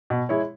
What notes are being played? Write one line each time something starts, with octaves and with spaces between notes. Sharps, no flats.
B2
G#3 E4 C#5